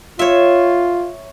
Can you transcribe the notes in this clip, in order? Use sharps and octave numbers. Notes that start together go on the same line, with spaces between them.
F4 C#5 E5